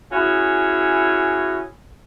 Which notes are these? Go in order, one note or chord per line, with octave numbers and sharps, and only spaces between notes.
C#4 E4 F#4 G#4